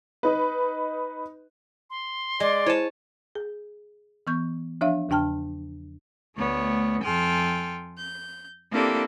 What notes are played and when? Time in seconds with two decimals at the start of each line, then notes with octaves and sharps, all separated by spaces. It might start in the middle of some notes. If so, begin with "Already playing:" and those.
0.23 D#4 B4
1.90 C6
2.40 G#3 D5
2.66 E4 C5 C#5 A5 D#7
3.35 G#4
4.27 E3 B3 C#6 G6
4.81 F3 D4 C#5 E5 F5
5.09 E2 C#3 D4 G5 A5 F6
6.35 D2 A3 B3 C#5
7.01 F2 A4 G5 G#5 C6 F6
7.98 G6
8.70 A#3 C4 D4 E4 G4 A4